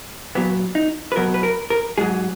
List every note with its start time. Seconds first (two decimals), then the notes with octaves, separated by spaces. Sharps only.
0.35 A#2 F#3 B3
0.75 D#4
1.12 B4
1.16 B2 F#3 A#4
1.34 B4
1.43 A#4
1.70 A#4
1.98 G#2 F#3 G#4